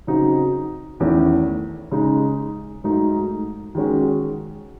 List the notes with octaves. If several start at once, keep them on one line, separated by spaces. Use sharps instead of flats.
C#3 F#3 C4 D#4 F#4
E2 D#3 A3 C#4 E4
C#3 G#3 D#4
G#2 F#3 A3 D#4
D#3 G#3 C#4 F#4